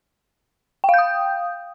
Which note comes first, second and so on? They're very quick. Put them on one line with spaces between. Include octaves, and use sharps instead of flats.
G5 F5 G6 D#6